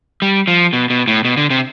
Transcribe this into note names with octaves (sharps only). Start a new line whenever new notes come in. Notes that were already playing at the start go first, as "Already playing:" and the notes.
G3
F3
B2
B2
A2
B2
D3
C3